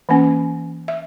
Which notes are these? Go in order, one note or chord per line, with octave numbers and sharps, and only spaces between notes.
E3 A#3 C#4
E5